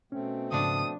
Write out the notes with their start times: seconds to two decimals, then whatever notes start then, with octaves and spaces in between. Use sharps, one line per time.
0.12 B2 A3 C4 C#4
0.52 G#2 C#3 F3 D4 D#6